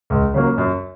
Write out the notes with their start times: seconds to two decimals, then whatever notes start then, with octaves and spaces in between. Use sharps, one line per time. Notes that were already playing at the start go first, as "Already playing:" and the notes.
0.10 C#2
0.34 C#3 F#3 A#3
0.58 F#2